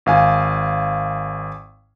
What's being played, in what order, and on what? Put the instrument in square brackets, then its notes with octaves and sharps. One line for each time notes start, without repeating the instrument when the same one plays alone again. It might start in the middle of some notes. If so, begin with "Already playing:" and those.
[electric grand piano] G#1 F5 G#5